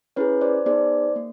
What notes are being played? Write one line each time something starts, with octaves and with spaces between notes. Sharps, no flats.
C#4 E4 G#4 B4 C#5
C5 D5
B3 D#4 G#4 C5 D5
A#3